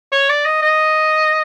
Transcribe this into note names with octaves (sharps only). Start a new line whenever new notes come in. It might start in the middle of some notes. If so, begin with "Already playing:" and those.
C#5
D5
D#5
D#5